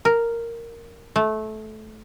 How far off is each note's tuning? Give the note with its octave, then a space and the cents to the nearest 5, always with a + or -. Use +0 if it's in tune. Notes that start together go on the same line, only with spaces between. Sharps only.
A#4 -5
A3 -20